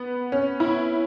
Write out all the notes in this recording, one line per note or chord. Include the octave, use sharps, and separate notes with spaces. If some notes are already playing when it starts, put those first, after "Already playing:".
Already playing: B3
C#4
E4